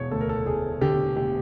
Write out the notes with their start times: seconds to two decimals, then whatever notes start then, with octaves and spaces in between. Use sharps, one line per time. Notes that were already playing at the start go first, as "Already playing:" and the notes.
Already playing: E1 C#5
0.11 D2 A4
0.21 A#4
0.29 A4
0.46 E1 G#4
0.81 D3 G4
1.16 E1 G4